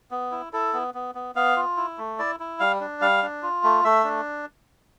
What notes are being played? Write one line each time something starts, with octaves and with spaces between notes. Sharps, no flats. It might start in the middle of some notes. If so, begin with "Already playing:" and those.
B3
E4
E4 A4
B3
B3
B3
B3 F5
F4
E4
A3
E4 D5
E4
G3 F5
D4
G3 F5
D4
F4
A3
A3 E5
D4